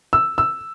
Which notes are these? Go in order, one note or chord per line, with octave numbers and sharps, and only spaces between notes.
E6
E6